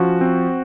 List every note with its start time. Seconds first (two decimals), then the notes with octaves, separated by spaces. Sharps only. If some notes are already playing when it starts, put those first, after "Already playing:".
Already playing: F3 C#4 F#4
0.21 C4